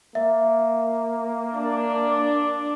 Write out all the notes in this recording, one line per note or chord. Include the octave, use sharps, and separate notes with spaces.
A#3 E5
D4